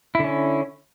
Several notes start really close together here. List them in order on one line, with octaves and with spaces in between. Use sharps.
E4 D3 C#4